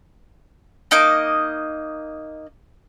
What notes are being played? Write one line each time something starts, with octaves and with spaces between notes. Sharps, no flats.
A#3 D#4 D#5 D6